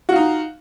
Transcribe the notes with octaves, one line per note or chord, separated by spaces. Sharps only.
D#4 F4 F#4